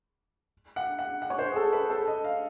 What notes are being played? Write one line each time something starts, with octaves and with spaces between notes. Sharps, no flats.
F#5
F#5
F#5
C#5
C5
G#4
A4
B4
A4
D#5
F5